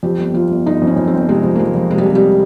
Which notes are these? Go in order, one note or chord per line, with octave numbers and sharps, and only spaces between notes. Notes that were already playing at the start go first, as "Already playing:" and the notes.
F2 G4
G1
F2 F4
G1
G1 D#4
F2
C#4
F2
C4
G1
C3 G#3
F2
A#3
F2 G#3
F2
C3 G#3
G3
C3
G3